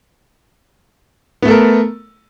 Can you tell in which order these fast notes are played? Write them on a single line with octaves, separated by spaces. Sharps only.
B3 A3 A4 A#4